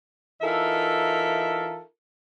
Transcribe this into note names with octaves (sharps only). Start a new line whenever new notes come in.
E3 D#4 F4 A4 A#4 E5